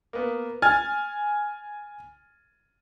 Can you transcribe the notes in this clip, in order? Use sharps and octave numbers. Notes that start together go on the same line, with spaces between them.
A#3 B3
G#5 F6 G#6 A6